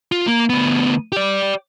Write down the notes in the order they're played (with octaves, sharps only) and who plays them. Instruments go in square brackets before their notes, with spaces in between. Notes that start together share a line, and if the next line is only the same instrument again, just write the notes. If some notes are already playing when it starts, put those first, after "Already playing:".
[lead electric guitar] F4
A#3
D2 B3
G4 D5